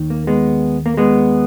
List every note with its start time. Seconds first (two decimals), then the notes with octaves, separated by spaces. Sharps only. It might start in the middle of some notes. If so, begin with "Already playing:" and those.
Already playing: D#2 D#3
0.10 A#3
0.27 G#3 B3
0.86 A#3
0.97 G#3 B3